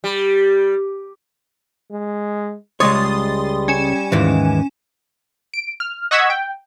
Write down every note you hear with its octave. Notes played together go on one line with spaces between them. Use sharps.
G3
G#3
C#2 G3 G#3 C#5 C6 D#6 A6
C#4 G#5 E7
D#2 G#2 E3
D7
F6
D#5 F#5 C#6 E6 G#6 B6
G5